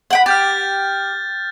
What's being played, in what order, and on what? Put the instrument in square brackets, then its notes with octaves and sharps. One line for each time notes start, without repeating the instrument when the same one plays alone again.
[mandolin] F#5 G5 B5
[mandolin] G4 [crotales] F6 G6 A6